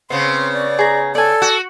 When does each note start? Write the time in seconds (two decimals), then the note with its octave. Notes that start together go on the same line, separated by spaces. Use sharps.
0.10 C#3 B3 C4 C6
0.53 D5
0.79 G#4 A#5
1.15 A4 D5 G#5
1.42 F#4